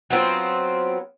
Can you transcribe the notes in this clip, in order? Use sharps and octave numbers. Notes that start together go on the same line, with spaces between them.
F#3 B3 C4 F4